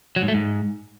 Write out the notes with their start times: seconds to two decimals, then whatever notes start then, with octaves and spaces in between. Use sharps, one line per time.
0.16 F#3
0.22 G#2
0.28 A3
0.34 G#2